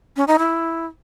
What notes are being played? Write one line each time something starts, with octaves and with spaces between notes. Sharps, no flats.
C#4
D#4
E4